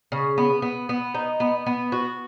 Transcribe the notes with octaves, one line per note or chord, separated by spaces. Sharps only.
C#3
B3
B3
B3
D#4
B3
B3
F#4